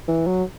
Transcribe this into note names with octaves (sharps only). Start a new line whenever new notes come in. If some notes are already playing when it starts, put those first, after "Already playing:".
E3
F#3